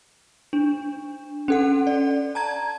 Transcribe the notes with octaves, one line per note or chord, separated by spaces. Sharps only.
D4
C#4 A4 F#5
D5
A5 A#5 G#6